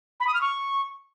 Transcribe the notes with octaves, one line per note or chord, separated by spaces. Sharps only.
B5
D#6
F6
C#6